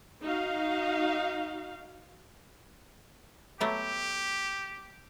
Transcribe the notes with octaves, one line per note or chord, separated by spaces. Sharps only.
D#4 F#4 F5
F#3 A3 B3 G4